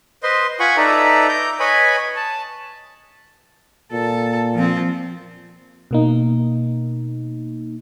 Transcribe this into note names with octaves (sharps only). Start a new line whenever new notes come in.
B4 C5 D#5 C6
F4 F#5 G#5 B5 C#6
D#4 A4 B4 D5 E5 A#5
A#5 D6 G6
B4 C#5 D#5 G#5 B5
A5
A#2 A4
F3 C4
B2 A#3 D#4